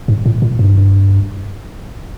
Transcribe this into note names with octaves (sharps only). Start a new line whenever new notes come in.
G#2
A2
A#2
G2